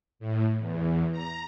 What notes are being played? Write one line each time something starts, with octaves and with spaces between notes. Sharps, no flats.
A2
E2
A#5